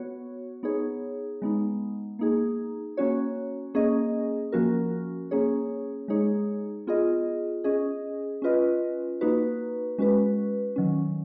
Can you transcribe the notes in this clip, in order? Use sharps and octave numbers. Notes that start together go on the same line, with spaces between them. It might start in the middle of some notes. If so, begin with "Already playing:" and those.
Already playing: B3 F#4 C#5
B3 D#4 G#4 C#5
G#3 B3 D#4
A#3 D#4 G#4
A#3 C#4 F#4 C#5
A#3 C#4 G#4 D#5
F3 A#3 C#4 F#4 A#4
A#3 C#4 G#4 C#5
G#3 D#4 G#4 C#5
B3 F4 G#4 D#5
C#4 G#4 D#5
C#4 F4 B4 D#5
A#3 D#4 F#4 B4
G#3 C#4 F#4 B4
D#3 F#3 C#4